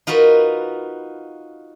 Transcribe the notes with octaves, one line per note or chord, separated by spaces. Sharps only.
D#4 F4 F#4 A#4 B4